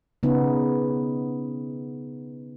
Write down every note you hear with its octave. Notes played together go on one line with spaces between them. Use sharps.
C#3 B3 D#4